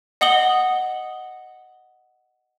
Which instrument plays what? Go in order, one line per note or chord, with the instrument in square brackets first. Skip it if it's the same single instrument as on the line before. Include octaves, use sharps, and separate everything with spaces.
[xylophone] D#5 F#5 D#6 F#7 G7